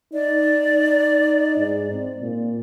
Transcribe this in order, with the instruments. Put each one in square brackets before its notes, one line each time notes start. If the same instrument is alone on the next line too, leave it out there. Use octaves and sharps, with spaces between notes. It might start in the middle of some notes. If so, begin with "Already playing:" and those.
[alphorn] D#4 [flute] D5
[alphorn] G#2
C4
A#2